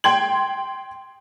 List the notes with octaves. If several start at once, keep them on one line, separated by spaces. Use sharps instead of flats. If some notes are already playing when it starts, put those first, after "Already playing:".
G5 C6 G#6 F#7